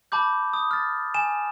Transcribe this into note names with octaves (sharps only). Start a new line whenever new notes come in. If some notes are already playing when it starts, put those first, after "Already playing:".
A5 B5 D6 G6
D#6
F6 A6
G#5 E7